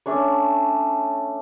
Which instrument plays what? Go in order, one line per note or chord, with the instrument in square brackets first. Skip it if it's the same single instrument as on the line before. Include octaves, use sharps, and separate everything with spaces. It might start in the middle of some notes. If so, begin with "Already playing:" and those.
[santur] A3 C#4 D4 C#5